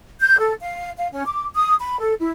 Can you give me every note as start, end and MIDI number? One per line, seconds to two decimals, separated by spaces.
0.21 0.38 91
0.39 0.53 69
0.62 0.90 77
0.97 1.08 77
1.12 1.23 61
1.26 1.45 86
1.55 1.75 87
1.80 1.98 83
2.00 2.13 69
2.20 2.30 64